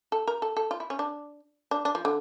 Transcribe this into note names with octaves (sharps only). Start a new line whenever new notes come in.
A4
A#4
A4
A4
F4
E4
C#4
D4
D4
D4
F3
D3